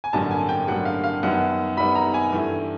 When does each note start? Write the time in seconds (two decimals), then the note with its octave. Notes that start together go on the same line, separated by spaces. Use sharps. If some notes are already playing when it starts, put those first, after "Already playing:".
0.04 G#5
0.13 A1 G2 D3 F#3 A#3 A5
0.31 G#5
0.49 G5
0.68 A1 G2 D3 F#3 A#3 F#5
0.85 F5
1.04 F5
1.23 F#2 D#3 G3 B3 F#5
1.77 F#2 D#3 G3 B3 B5
1.95 A#5
2.14 G#5
2.32 G2 E3 A3